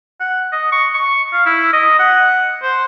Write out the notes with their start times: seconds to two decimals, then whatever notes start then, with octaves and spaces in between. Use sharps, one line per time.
0.20 F#5
0.52 D#5
0.72 C#6
0.94 C#6
1.33 F5
1.46 E4
1.73 D#5
1.99 F#5
2.63 C5